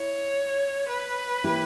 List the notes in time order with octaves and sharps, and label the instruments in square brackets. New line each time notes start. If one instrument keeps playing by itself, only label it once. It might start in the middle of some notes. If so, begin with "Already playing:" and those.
Already playing: [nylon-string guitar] E4 [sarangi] C#5
[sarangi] B4
[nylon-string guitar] E3 A#3 E4 G4